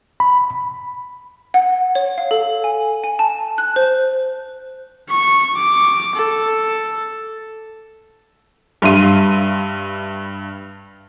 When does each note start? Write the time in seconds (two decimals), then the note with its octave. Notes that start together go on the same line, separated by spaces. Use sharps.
0.20 B5
1.54 F#5
1.95 C#5
2.18 F5
2.31 A4
2.64 G#5
3.04 G#5
3.19 A5
3.58 F#6
3.76 C5
5.10 C#6
5.56 D6
6.16 A4
8.82 G2 G3 E5 F5 C6 D#7